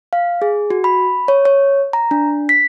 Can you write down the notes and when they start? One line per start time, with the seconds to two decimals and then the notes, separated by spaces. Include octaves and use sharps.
0.13 F5
0.42 G#4
0.70 F#4
0.84 B5
1.28 C#5
1.45 C#5
1.93 A#5
2.11 D4
2.49 B6